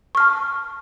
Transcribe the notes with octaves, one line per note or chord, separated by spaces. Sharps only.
A5 C#6 F6